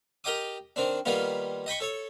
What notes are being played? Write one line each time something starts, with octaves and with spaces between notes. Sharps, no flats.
G4 A#4 D#5 G5 D6 D#6
D#3 C4 D4
D#3 G3 A#3 B3 F4
D#5 G5 B5 C#6
A4 C#5